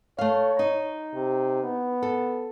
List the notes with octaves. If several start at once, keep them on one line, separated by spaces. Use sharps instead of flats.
A3 C#5 F5
D#4
C3
B3
A4